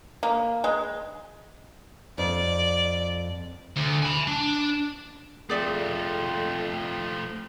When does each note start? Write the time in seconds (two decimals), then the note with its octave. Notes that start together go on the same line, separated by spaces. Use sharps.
0.23 A#3
0.64 G#3
2.18 F2 D5
3.76 D2
4.03 G#5 B5
4.27 D4
5.50 F2 F3 A3 G#4 D5 E5